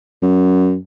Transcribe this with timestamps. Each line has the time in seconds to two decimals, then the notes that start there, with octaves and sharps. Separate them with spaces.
0.22 F#2